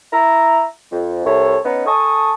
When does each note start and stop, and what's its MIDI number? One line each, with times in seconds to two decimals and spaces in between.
0.13 0.64 64
0.13 0.64 76
0.13 0.64 82
0.92 1.22 41
1.25 1.58 36
1.25 1.58 64
1.25 1.58 69
1.25 1.58 73
1.65 1.85 59
1.65 1.85 61
1.65 1.85 63
1.86 2.33 69
1.86 2.33 80
1.86 2.33 81
1.86 2.33 85
1.86 2.33 87